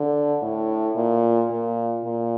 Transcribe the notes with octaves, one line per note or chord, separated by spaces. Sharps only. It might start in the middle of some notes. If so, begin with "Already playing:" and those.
Already playing: D3
A2
A#2
A#2
A#2